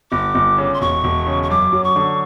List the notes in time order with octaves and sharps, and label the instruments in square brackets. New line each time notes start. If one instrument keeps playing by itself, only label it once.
[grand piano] G1 [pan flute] D6
[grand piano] G1
C#3
[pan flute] C6
[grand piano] E1 [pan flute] C#6
[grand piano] E1
C#3
[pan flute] C#6
[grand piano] F#2 [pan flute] D6
[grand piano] F#3
[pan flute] C#6
[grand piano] D3